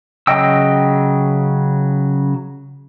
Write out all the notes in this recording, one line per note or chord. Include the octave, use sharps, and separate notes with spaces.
C#3 F#3 D#5 G5 E6